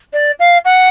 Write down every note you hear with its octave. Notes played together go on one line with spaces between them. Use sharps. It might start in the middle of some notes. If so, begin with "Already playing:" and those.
D5
F5
F#5